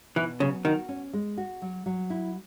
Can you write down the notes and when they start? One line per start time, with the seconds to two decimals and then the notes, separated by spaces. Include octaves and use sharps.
0.16 B2 E3
0.40 C#3 F#3
0.65 D#3 F#4
0.89 C#4
1.13 G#3
1.38 F#4
1.62 F#3
1.86 F#3
2.10 E4